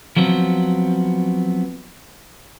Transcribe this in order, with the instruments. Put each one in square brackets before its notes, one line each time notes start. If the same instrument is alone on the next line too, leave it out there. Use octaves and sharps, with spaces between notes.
[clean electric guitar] F3 F#3 B3 C4